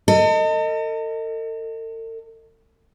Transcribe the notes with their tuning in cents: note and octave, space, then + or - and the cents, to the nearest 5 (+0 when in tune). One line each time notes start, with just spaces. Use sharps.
A4 +45 D#5 +0